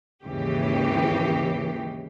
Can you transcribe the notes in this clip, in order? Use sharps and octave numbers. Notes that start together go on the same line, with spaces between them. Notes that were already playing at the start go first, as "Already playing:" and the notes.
G#1 D#2 C#3 E3 G4